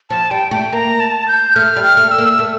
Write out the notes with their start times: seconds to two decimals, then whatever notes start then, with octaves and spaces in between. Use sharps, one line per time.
0.10 F3 A5
0.31 G3 G5
0.51 A3 G5
0.72 A#3 A#5
1.00 A5
1.28 G6
1.56 A3 F6
1.76 G3
1.84 F6
1.97 A3
2.11 E6
2.18 A#3
2.39 A3